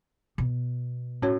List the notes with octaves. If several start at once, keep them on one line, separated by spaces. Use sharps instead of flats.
B2
A2 C#4 F#4 C#5